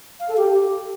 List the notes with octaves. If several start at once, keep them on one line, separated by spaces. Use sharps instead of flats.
F5
A4
G4